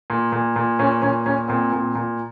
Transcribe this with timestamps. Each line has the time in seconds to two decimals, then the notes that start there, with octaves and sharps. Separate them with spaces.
0.10 A#2
0.32 A#2
0.56 A#2
0.79 A#2 C#4
1.02 A#2 C#4
1.26 A#2 C#4
1.48 A#2 C4
1.73 A#2
1.95 A#2